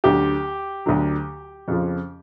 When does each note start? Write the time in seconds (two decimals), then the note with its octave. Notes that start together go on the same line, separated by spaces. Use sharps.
0.04 D2 D3 F#3 G4
0.86 D2 D3 F#3
1.68 F2 C#3 F3